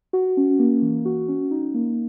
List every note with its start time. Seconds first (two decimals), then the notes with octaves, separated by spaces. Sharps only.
0.13 F#4
0.37 C#4
0.59 A#3
0.82 E3
1.05 F#4
1.28 C#4
1.51 D#4
1.74 A#3